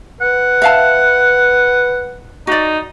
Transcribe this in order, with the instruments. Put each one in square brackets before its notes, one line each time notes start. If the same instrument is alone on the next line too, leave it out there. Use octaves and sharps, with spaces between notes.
[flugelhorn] B4 [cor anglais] F#5
[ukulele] E5 F5 A5
[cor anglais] D#4 [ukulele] F#4 D5